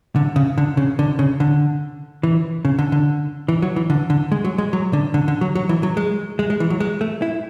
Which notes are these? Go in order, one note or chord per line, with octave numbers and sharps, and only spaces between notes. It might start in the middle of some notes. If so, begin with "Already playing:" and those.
D3
C#3
D3
C#3
D3
C#3
D3
E3
C#3
D3
D3
E3
F#3
E3
D3
D3
G#3
F#3
G#3
F#3
D3
D3
D3
F#3
F#3
E3
F#3
G#3
G#3
G#3
E3
F#3
G#3
A3
E4